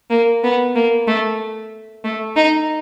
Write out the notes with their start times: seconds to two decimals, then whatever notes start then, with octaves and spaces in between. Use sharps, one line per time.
0.10 A#3
0.44 B3
0.75 A#3
1.07 A3
2.05 A3
2.36 D#4